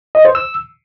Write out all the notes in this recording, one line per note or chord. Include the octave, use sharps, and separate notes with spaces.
D#5
C5
E6